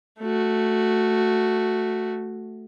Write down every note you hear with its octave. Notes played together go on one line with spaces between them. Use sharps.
A3 F#4